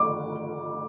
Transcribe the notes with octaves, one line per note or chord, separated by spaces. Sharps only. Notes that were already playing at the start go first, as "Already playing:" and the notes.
Already playing: D6